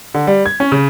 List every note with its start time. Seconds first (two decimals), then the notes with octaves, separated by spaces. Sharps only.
0.14 D3
0.27 G3
0.46 G#6
0.60 C#4
0.72 C#3